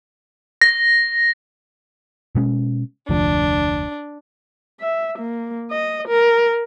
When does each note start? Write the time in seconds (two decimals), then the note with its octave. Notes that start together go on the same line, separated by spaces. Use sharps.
0.62 A#6
2.35 B2 G#3 C#4
3.10 F1 D2 F3 D4
4.81 E5
5.19 A#3
5.71 D#5
6.08 A#4